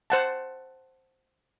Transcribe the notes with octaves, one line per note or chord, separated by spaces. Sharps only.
C5 F#5 A5